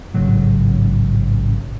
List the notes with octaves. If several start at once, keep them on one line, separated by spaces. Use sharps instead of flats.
A1 G#2 C#3 F#3